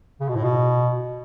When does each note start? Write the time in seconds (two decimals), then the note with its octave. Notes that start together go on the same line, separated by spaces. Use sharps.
0.21 C#3
0.29 B2
0.36 A2
0.44 B2